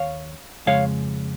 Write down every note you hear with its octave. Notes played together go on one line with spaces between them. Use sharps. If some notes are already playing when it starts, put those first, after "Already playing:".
Already playing: D#2 D#3 C#5 F5
F2 C#3 G#3 C#5 F5